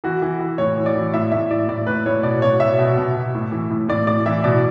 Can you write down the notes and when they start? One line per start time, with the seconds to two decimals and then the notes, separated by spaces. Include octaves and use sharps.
0.04 E3 F#4
0.22 E3
0.40 E3
0.58 A2 C#5
0.77 E3
0.86 D5
0.96 E3
1.14 A2 E5
1.32 A2 E5
1.50 A2 D5
1.68 A2 D5
1.86 A2 B4
2.06 A2 C#5
2.23 B2 D5
2.42 B2 C#5
2.60 B2 E5
2.79 B2
2.97 B2
3.15 B2
3.35 A2
3.52 E3
3.70 A2
3.88 A2 D5
4.07 A2 D5
4.26 E3 E5
4.44 B2 D5